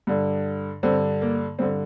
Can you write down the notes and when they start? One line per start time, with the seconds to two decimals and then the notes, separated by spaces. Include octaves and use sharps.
0.07 G2 D3
0.83 G2 D3 C4
1.22 A#3
1.59 G2 D3 C4